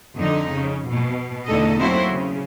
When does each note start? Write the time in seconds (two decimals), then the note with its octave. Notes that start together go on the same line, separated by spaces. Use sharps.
0.16 F2 D3 D#4
0.53 C#3
0.89 B2
1.46 E2 D3 A3 D#4 A4 D#5
1.78 F#3 A#3 C4 E4 F#4 C5
2.10 C#3